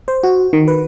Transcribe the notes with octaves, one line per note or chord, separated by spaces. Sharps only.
C5
F#4
D#3
B4